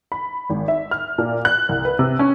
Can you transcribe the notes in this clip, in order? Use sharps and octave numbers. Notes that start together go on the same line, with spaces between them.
B5
G#1
E5
F6
A#2
F#6
C2
B4
C3
C#4